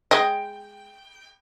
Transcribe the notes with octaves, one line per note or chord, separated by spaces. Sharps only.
G#3 D#5 G5